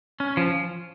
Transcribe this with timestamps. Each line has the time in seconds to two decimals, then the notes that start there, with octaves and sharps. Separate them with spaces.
0.20 C#4
0.37 F3